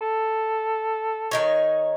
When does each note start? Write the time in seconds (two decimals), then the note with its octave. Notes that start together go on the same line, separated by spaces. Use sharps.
0.01 A4
1.31 D#3 D#4 C#5